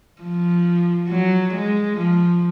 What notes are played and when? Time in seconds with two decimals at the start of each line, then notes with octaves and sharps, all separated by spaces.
0.22 F3
1.09 F#3
1.54 G#3
1.97 F3